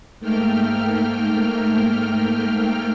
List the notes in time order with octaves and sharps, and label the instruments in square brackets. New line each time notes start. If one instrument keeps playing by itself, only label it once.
[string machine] G#2 A3 A#3 G5 F6